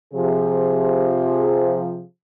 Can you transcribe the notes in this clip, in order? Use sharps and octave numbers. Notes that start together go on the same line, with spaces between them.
C3 F3 G#4